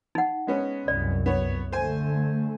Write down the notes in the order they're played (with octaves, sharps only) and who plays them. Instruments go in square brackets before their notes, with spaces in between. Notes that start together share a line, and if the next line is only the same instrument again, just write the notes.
[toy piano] D#4 F#5
[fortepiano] G#3 B3 C#4
[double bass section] C2 F#2 [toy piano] D5
[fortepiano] B3 C#5
[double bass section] D3 A3 [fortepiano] C5 G#5